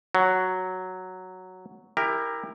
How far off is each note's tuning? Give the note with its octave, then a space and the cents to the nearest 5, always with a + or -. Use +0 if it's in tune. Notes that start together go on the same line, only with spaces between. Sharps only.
F#3 +0 F#5 +30
E4 +0 G4 +25 A#4 +0